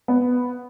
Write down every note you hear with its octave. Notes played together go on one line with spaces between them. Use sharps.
B3